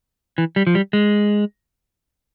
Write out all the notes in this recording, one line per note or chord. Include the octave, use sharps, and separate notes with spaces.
E3
G3
F3
G3
G#3